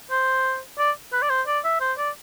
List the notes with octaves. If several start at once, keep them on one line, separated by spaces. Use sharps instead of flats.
C5
D5
B4
D5
C5
D5
E5
C5
D5